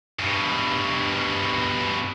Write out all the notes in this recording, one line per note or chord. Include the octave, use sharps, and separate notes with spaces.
G2 B2